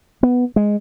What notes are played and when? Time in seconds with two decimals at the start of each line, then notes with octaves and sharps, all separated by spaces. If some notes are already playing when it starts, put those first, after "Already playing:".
0.23 B3
0.56 G#3